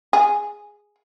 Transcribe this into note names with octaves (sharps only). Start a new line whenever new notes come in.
G#4